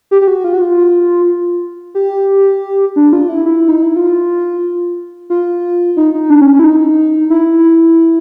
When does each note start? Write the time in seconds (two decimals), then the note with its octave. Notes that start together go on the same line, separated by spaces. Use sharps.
0.11 G4
0.21 G4
0.28 F#4
0.44 F4
0.54 F#4
0.61 F4
1.95 G4
2.96 D4
3.13 F4
3.29 E4
3.46 E4
3.68 D#4
3.83 E4
3.96 F4
5.30 F4
5.97 D#4
6.14 D#4
6.30 D4
6.41 C#4
6.53 C#4
6.59 E4
6.64 D#4
7.30 E4